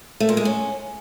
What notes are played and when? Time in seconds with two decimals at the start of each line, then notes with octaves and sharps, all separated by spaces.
0.20 A3
0.29 A#2
0.37 G#3
0.45 C#4